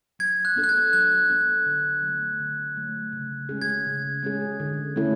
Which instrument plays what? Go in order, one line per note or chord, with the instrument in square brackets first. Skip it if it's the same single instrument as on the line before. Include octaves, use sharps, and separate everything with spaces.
[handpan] F#3 [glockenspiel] G#6
[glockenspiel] F#6
[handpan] B3 D4 A4
[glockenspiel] F#6
G#6
[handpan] F#3 [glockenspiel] F#6
[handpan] B3 D4 A4
D3
F#3
A3
D3
F#3 A3
C#3
G#3 C#4 G#4
[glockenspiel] G#6
[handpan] C#3
G#3 C#4 G#4
D3
A3 C#4 E4 A4